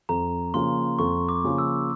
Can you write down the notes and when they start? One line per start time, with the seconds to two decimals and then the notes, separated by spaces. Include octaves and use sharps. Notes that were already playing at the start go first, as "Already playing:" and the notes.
0.09 F2 A#5
0.54 C#3 F3 A#3 C6
0.99 F2 C#6
1.29 D6
1.44 C#3 F3 A#3
1.58 E6